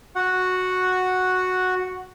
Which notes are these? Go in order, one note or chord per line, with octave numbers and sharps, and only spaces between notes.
F#4 F#5